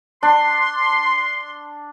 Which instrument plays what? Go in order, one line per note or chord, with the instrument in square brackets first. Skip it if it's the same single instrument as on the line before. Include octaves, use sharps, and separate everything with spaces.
[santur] D4 [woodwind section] C6